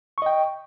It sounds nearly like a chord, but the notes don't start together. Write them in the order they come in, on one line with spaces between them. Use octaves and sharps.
C#6 D#5 G5